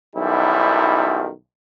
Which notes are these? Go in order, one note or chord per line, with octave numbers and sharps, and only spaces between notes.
B1 F#2 D#3 G3 E4